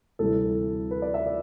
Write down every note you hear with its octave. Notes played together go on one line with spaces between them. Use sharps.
D2 C3 E3 G3 A4
B4
D5
E5
D5